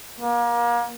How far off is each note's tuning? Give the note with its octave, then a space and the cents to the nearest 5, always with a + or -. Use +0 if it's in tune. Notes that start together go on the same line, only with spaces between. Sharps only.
A#3 +30